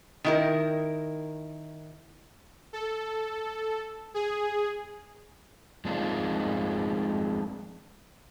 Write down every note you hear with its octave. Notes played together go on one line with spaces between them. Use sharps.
D#3 E4 A#4
A4
G#4
F3 G#3 C4 D4 D#4 F4